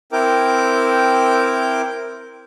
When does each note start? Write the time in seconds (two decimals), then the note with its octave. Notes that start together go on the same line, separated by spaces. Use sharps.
0.12 C4 E4 A#4 G5 D6